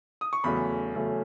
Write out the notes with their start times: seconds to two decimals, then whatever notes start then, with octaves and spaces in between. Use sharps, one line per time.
0.21 D#6
0.33 C#6
0.44 E2 C#3 F#3 A3 C#4 B5
0.95 E2 C#3 F#3 A3 C#4